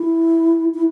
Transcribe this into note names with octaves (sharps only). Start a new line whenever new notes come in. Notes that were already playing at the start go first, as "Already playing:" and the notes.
Already playing: E4
E4